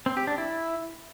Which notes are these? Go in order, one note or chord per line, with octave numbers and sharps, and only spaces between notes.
C4
G4
D4
E4